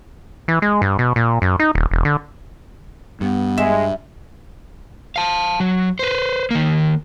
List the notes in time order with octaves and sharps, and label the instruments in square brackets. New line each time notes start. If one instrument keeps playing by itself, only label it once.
[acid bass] E3
G#3
G2
B2
A#2
F#2
D#4
D#1
E1
D3
[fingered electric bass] G2 [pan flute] B3
[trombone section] G#3 [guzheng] E5
[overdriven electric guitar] F5 A5
F#3
B4 C5
D#3 A#3